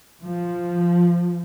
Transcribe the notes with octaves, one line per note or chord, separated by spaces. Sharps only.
F3